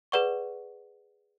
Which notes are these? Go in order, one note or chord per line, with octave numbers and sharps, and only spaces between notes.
G#4 B4 D5 F#5 C#6